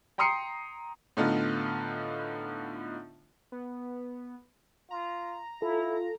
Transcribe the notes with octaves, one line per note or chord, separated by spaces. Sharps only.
G5 A#5 C6 D#6 C7 C#7
A2 D3 B3 D#4 F4
B3
F4 A#5
E4 F4 A4